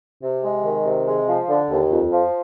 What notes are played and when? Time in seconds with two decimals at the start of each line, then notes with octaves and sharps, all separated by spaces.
0.23 C3
0.43 G#3
0.64 D#3
0.86 C3
1.07 G#3
1.28 F3
1.49 D3
1.70 D#2
1.91 F2
2.12 F3